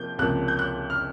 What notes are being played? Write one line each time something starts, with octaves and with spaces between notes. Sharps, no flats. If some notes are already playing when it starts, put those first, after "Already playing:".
Already playing: C3 F3 A#3 G6
C#2 C3 F3 A#3 F#6
G6
F#6
F6